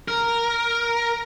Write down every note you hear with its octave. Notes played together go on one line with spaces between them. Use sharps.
A#4